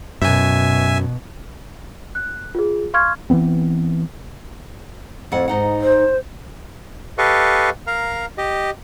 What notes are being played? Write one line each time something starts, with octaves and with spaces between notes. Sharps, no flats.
F#2 B2 E5 G#5
F#6
F4 G#4
F5 C6 C#6 F6 G#6
E3 F#3 B3 C4
F2 A2 F#5
G#2 D#4 F#5
C5
G4 A4 B4 D#5 F5 C#6
A#4 F5 A#5
G4 D#5